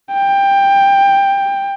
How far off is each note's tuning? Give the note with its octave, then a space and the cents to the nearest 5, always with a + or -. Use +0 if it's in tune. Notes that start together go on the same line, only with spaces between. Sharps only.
G5 +15